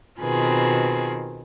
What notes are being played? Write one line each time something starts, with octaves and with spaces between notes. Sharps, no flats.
B2 D#3 C4 F4 G#4 B4